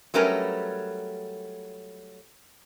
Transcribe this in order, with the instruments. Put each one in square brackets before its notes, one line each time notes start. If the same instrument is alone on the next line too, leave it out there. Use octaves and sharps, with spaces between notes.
[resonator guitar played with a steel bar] F#3 G3 A3 C#4 A#4 B4